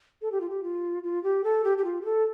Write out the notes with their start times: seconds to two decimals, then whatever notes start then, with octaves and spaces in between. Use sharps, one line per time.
0.22 A4
0.32 G4
0.41 F4
0.50 G4
0.63 F4
1.03 F4
1.24 G4
1.44 A4
1.64 G4
1.78 G4
1.84 F4
2.01 G4
2.05 A4